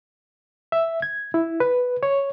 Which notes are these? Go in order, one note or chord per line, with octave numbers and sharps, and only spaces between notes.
E5
G#6
E4
B4
C#5